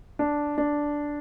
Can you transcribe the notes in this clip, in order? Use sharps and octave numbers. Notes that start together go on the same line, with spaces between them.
D4
D4